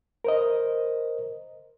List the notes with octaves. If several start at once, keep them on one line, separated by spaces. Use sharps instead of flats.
A#4 C5 D#5